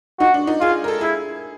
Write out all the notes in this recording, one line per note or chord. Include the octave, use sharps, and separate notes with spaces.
D#4 F#4
D4
D#4
F4 G#4
A#4
A4
E4 G#4